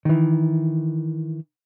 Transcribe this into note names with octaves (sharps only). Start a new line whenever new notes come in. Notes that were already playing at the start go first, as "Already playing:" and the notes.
D#3 E3